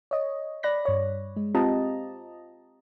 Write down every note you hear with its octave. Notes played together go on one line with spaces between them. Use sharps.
C#5 D#5
D5 B5 F#6 A#6
G2 C#5
G#3
C4 F4 G4 D#5 A5 A#5